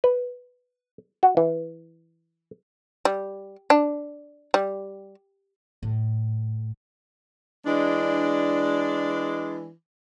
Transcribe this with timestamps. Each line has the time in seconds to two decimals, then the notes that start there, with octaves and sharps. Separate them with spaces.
0.04 B4
1.23 F#4
1.37 E3
3.05 G3
3.70 D4
4.54 G3
5.83 A2
7.66 E3 G#3 D4